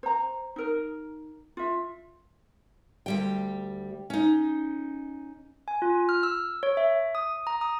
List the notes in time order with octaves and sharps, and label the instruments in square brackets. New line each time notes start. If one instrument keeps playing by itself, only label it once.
[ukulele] C5 A#5
D#4 A#4
F4 E5
[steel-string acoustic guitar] D2 G3 G5
C#4 D#4
[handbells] G#5
F4
F6
E6
C#5
E5
D#6
A#5
D#6